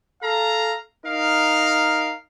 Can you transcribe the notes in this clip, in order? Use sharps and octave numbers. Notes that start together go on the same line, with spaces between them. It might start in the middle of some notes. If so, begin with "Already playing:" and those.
A4 F5 A#5
D#4 A#4 F5